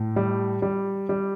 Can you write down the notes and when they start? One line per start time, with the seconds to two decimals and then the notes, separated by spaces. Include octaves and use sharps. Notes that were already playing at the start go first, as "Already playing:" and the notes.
Already playing: A2
0.16 G3
0.62 G3
1.09 G3